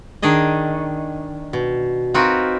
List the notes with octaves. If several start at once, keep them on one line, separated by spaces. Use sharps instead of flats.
D#3 D4 G#4 D#5
B2
C4 D#4 F4 F#4 A#4 B4